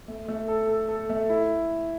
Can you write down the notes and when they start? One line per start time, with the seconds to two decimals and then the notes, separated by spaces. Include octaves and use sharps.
0.08 A3
0.28 A3
0.48 A4
0.69 A4
0.88 A4
1.10 A3
1.30 E4